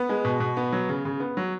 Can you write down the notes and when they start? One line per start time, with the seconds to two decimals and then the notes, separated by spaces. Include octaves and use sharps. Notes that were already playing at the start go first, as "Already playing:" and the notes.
Already playing: B3
0.09 G#3
0.25 B2
0.40 B2
0.57 B3
0.72 F#3
0.89 C#3
1.05 C#3
1.20 B3
1.37 F#3